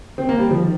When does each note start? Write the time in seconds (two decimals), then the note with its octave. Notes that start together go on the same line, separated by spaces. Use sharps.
0.18 C4
0.29 A#3
0.39 G3
0.51 F3
0.62 D#3